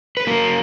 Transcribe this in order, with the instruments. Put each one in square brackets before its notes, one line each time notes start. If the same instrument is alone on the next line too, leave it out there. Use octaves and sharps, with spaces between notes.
[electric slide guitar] B4
F#3 A#3 A#4